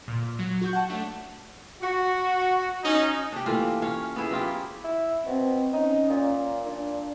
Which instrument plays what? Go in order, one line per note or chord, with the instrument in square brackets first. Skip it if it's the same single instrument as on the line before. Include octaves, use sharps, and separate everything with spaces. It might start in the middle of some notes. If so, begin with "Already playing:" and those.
[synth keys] A#2
F#3
F#4 C#6 G6
F#5 A5
A3 D4 C#5
[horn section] F#4
C#4 D#4
[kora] D4 G4
E3 A3 A#3 F4
C#4 C#5 F5
B3 E4 G#4
F#3 F4 G4
[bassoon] E4
[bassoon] B2 [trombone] C4
[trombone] C#4 [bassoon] D#4
[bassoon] A#2
[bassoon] A#2 [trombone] D4